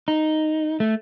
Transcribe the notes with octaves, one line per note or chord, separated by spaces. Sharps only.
D#4
A3